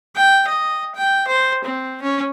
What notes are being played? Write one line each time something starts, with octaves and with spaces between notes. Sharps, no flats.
G5
D#5
G5
C5
C4
C#4